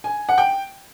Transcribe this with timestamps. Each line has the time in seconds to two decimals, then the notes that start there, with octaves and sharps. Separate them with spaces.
0.04 G#5
0.29 F#5
0.38 G5